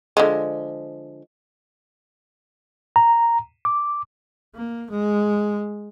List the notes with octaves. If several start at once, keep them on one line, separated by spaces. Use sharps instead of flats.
D3 F3 G#3
A#5
D6
A#3
G#3